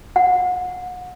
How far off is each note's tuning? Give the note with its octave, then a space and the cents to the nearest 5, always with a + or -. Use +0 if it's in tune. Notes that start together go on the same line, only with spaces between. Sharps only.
F#5 -35